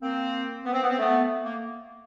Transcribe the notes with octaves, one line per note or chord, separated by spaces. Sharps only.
A#3 C4
B3
C4
B3
C4
A3 B3
A#3